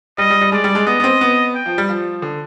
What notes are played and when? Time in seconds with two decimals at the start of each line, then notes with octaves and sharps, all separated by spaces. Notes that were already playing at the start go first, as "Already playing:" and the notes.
0.18 G3 D#5
0.30 G3
0.41 G3
0.52 G#3 D5
0.64 G3
0.75 G#3
0.87 B3 D#5
1.00 B3
1.04 C4
1.21 B3
1.55 G5
1.66 F3
1.78 G3
1.89 F3
2.22 D3